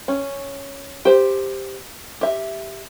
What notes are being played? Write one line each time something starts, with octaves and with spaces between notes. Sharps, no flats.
C#4
G4 C5
G4 E5